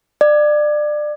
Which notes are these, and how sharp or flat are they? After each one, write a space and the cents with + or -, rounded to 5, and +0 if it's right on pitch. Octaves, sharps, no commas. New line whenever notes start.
D5 +25